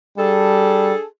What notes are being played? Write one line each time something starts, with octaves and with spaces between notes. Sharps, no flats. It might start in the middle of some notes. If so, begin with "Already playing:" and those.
G3 D4 G#4 A4